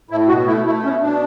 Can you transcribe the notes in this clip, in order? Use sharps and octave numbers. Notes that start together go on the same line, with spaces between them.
A2 E4
B2 F#4
A3 E4
A3 E4
B2 C#4
B2 D4